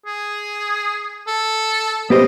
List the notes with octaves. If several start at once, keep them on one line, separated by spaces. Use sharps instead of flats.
G#4
A4
B3 G4 C5 D#5